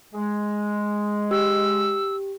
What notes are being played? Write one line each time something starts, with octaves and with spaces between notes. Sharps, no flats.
G#3
G4 E6